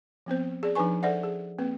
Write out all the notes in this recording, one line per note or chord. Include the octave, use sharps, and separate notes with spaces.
F3 B3 C4 C5
G#4 D5
F3 D4 D#4 B4 G#5 C#6
A4 C5 D5 E5 F#5
G#4
A#3 C4 B4